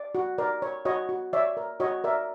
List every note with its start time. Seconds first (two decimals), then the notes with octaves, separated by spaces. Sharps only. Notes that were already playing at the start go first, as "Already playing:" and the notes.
Already playing: D5
0.15 F#4
0.38 A#4 D5
0.62 C#5
0.85 F#4 C#5 D#5
1.09 F#4
1.33 C#5 D5 E5
1.57 A#4
1.80 F#4 C#5 D#5
2.04 A#4 D5 E5